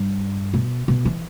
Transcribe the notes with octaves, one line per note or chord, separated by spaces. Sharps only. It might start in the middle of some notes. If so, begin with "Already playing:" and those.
Already playing: G2
B2
B2
E3